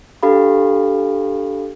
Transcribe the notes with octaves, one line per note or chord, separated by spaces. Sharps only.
D4 G4 A4 F5 B5